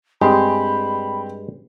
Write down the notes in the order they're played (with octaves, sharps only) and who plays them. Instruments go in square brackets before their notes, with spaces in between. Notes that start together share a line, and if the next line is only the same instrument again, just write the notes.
[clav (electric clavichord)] G2 G#3 [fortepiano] C4 G4 [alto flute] B5